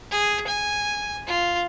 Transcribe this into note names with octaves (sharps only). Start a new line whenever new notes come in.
G#4
G#5
F4